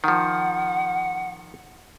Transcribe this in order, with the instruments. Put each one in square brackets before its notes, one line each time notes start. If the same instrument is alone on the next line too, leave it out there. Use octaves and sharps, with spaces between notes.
[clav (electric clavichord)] D#3 F3 [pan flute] F#5